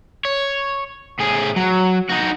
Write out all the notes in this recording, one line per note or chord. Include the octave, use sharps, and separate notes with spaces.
C#5
A2 G#4
F#3
D#4 F#4